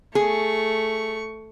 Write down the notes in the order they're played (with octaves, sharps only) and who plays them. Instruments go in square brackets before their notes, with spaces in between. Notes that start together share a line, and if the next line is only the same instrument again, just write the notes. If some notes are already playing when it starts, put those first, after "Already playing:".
[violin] A3 C#6 [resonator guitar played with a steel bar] G#4